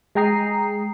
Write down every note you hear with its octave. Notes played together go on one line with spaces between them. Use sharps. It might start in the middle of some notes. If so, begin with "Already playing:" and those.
G#3 G#4 G5 A#5 D#6 C7